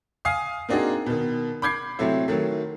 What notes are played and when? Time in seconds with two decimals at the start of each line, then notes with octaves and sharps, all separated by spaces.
0.25 F5 G#5 D#6 C7
0.69 A#3 C4 D4 D#4 F#4 G#4
1.06 B2 D#3
1.62 B5 D6 G6 G#6 C7
1.99 C3 F#3 A3 C4 E4
2.28 D#3 F#3 A3